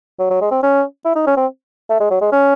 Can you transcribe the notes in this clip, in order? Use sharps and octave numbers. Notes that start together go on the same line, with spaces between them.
F#3
F#3
G#3
C4
C#4
E4
D#4
C#4
C4
A3
G#3
F#3
G#3
C#4